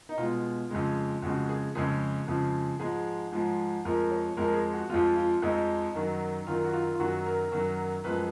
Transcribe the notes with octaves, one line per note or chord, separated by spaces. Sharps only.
D#4
B2 G#3 F4
F2 C#3 G#3
F2 C#3 G#3 F#4
G#4
F2 C#3 F3 G#3 G#4
F2 C#3 F3 G#3
G#2 F3 G#3 G#4
G#2 F3 G#3
F2 F3 G#3 A#4
C#5
F2 F3 G#3 A#4
G#4
F#4
F2 F3 G#3 F4
F4
F2 F3 G#3 D#4
F#2 D#3 F#3
F#2 D#3 F#3 F4
F#4
F4
F4
F#2 D#3 F#3 F#4
A#4
F#2 D#3 F#3
F#2 F3 G#3 B4